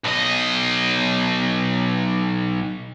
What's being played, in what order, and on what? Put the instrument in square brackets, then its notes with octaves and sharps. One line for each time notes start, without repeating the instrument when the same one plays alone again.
[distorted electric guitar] B1 D#5